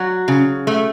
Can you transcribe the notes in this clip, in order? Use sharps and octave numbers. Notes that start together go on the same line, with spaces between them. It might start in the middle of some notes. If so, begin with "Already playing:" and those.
Already playing: F#3 F#4
C#3
A3